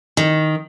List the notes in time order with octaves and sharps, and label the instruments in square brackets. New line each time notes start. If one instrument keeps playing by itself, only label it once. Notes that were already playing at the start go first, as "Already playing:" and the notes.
[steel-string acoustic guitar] D#3